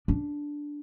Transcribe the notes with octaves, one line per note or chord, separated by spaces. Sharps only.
D4